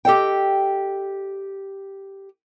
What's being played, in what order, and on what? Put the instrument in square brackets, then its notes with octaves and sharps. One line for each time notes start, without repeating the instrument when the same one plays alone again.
[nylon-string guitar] G4 A4 D#5 G5